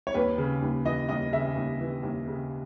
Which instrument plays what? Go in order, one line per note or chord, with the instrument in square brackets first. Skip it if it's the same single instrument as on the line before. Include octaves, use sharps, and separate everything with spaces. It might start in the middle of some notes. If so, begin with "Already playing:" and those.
[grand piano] C#5
D#2 B4
C#3
D#2
E3 D#5
D#2 D#5
C#3 E5
D#2
E3
D#2
C#3